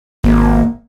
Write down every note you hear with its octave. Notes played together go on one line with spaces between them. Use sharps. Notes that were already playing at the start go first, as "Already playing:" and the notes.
G#1 A#3